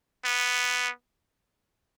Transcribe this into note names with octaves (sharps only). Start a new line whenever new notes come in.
B3